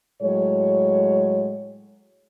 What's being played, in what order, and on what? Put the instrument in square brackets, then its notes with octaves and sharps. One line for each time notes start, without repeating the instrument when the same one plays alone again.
[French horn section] A2 F#3 G#3 C#5